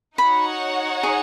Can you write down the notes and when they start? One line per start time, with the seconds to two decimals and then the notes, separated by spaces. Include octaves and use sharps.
0.18 D#4 F#4 C#5 F#5 B5
1.03 G#4